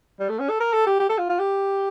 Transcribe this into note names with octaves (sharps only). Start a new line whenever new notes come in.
G3
A3
C#4
A4
A#4
A4
G4
G4
A4
F4
F4
G4